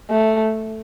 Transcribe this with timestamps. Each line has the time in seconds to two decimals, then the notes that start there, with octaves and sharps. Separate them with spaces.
0.10 A3